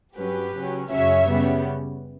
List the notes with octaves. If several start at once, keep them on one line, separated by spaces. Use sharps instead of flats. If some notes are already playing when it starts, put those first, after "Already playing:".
G2 F#3 C#4 G4 B4
C#3 F#3 C#4
F#2 C#3 F#3 C#4 C#5 E5
C#3 G3 B3